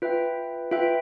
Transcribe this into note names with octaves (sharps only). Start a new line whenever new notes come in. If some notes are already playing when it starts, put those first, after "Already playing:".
F4 B4 E5 G5
F4 B4 E5 G5